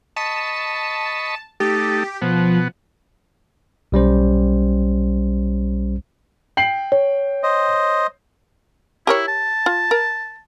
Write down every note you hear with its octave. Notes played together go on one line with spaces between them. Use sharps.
D#5 A5 B5 C#6
A3 D#4 G4 A4
B2 F3 B3 F#5
B1 G3 C#4 C5
G5 C7 F#7
C#5
C5 D#5
E4 G4 A#4 C#5
A5
F4
A#4